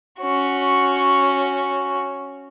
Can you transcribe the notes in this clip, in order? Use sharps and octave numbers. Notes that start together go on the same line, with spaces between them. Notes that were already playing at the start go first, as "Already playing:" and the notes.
C#4 F#4